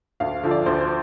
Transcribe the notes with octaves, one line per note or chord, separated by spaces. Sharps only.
D2 F5
D3 F3
D5
D2 C5
C5